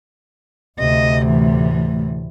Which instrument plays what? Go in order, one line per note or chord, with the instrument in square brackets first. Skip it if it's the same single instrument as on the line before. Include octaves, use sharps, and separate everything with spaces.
[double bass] D2 C3 [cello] D#5
[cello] A2 E3